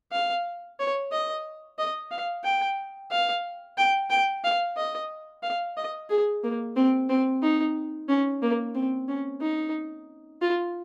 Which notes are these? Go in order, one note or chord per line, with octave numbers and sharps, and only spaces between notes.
F5
C#5
D#5
D#5
F5
G5
F5
G5
G5
F5
D#5
F5
D#5
G#4
A#3
C4
C4
D#4
C#4
A#3
C4
C#4
D#4
F4